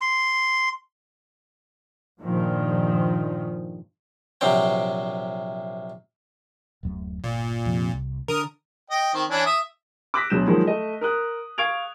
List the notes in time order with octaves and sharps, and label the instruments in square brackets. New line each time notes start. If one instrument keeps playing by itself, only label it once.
[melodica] C6
[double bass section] G2 A#2 D#3 F3
[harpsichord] A#1 C3 F#3 C4 G5
[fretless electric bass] D1 F#2 A3
[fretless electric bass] G1 [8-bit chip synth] A#2
[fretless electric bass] F2 C3
C2
[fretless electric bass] D3 [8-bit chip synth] A#4 D#6
[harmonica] D#5 G5
D#3 C4
E3 C#4 D4
E5 D#6
[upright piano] D6 E6 F#6 A#6 B6
D2 B2 F#3 G6 E7
D#3 F3 F#3 G#3 A#3
A3 D#5
A#4 D#6 F#6
F5 C#6 G#6 D7 F7